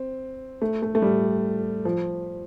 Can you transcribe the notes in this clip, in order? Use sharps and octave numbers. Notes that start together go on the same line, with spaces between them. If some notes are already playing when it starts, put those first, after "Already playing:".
Already playing: C4
A3
A3
A3
G3
F3